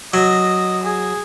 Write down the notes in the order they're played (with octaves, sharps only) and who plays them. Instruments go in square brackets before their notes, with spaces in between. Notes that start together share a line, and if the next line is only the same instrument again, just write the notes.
[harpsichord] F#3 [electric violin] D#5
[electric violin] G#4